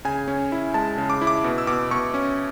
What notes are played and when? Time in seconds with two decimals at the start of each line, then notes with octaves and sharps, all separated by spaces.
0.05 C#3 G#5
0.28 C#4
0.52 E4
0.74 G#3 A5
0.98 C#3
1.10 D6
1.22 E4
1.27 D6
1.44 B2
1.58 E6
1.67 B2 D6
1.91 B2 C#6
2.14 C#4